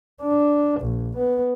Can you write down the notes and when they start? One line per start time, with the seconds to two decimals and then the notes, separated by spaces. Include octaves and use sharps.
0.22 D4
0.80 A#1
1.17 B3